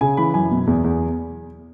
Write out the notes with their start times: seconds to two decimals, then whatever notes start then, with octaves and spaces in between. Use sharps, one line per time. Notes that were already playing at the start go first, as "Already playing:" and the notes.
0.01 C#3 G#5
0.17 E3 B5
0.34 F#2 G#5
0.51 B2
0.67 E2
0.84 E2